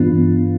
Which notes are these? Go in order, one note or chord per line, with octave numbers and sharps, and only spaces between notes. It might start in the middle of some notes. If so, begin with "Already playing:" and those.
Already playing: G2 E3 B3 D4 F4